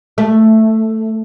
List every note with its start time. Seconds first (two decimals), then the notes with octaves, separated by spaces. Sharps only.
0.18 A3